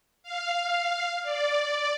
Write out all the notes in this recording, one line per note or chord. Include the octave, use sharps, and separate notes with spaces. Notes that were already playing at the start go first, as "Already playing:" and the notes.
F5
D5